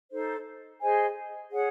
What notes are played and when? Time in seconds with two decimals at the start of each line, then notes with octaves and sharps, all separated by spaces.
0.11 D#4 A4 C5
0.81 G#4 C5 D#5 G#5
1.51 G#4 C#5 F#5